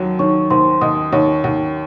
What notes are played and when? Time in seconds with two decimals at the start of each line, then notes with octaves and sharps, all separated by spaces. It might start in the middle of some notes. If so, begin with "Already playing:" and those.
Already playing: D#2 F#3
0.19 D#3 C#5 C#6
0.50 D#2 C5 C6
0.81 D#2 D#5 D#6
1.13 D#2 C#5 C#6
1.44 D#2